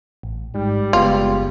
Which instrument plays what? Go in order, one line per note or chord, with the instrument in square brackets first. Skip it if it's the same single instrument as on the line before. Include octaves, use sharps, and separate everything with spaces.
[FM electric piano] A1
[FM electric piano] G#2 [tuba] G3
[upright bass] F#1 [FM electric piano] G#3 B3 [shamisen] F4